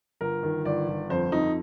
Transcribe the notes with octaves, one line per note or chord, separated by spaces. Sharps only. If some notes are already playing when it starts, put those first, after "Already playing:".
G1 A#4
D#3
G1 D5
G1
F2 C5
F2 D#4